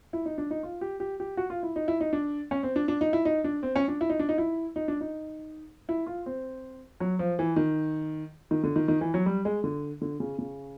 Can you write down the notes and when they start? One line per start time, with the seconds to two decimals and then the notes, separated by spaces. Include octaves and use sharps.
0.13 E4
0.26 D#4
0.38 D4
0.51 D#4
0.63 F4
0.81 G4
1.00 G4
1.20 G4
1.37 F#4
1.50 F4
1.63 E4
1.76 D#4
1.88 E4
2.01 D#4
2.13 D4
2.51 C#4
2.63 C4
2.76 D4
2.88 D4
3.01 D#4
3.13 E4
3.25 D#4
3.44 D4
3.63 C4
3.76 C#4
3.88 D4
4.01 E4
4.10 D#4
4.19 D4
4.29 D#4
4.38 E4
4.76 D#4
4.88 D4
5.01 D#4
5.89 E4
6.07 F4
6.26 C4
7.00 F#3
7.19 F3
7.39 E3
7.56 D#3
8.51 D#3
8.64 D3
8.76 D#3
8.88 D#3
9.01 E3
9.14 F#3
9.26 G3
9.45 G#3
9.64 D3
10.02 D3
10.20 C#3
10.39 C#3